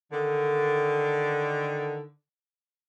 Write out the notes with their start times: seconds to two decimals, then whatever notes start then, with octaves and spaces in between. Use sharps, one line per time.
0.12 D3 D#3